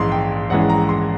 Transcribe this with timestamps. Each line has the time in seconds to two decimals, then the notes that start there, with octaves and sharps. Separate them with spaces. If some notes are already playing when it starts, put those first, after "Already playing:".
Already playing: A#1 G#2 E3 G#3 C#4 C6
0.12 G5
0.50 A#1 G#2 E3 G#3 C#4 F#5
0.69 A#5
0.89 C6